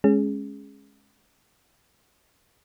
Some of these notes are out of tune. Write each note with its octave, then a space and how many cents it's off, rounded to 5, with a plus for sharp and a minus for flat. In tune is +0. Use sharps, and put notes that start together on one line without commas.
G#3 +10 C#4 -5 G#4 +0